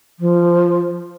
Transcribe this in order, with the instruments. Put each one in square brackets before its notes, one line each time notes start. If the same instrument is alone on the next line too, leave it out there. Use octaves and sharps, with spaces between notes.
[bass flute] F3